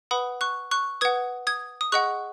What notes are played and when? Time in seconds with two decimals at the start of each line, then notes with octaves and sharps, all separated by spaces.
0.11 B4 F#5 B5 D#6
0.41 C#6 F#6
0.71 C#6 F#6
1.01 B4 F#5 D#6 G#6
1.47 D#6 G#6
1.81 D#6
1.92 G#4 D#5 F#5 C#6 F#6